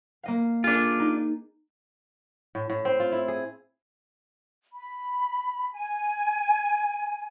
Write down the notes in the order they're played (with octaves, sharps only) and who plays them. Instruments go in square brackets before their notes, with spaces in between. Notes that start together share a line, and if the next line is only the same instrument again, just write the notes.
[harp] A#3 D#5 F5
[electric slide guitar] D4 F4 [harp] G#4 A#4
[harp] D#4
[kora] A2
A2
C4
F4
E4
G#4
[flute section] B5
G#5